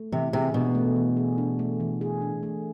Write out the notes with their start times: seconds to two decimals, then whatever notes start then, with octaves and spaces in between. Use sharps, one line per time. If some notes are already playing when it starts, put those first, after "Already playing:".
Already playing: A3
0.12 C3 E3
0.33 C3 G#4
0.54 B2 D4
0.75 A3
0.96 E3
1.17 G#4
1.38 D4
1.59 A3
1.80 E3
2.01 G#4
2.22 D4
2.43 A3